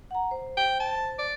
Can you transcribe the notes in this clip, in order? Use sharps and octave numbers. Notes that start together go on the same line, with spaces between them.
F#5 A#5
C5
G5
A5
D5